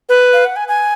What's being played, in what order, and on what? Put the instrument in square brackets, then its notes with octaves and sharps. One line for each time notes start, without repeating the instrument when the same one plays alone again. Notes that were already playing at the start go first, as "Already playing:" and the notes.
[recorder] B4
[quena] F5
F#5
G#5
G#5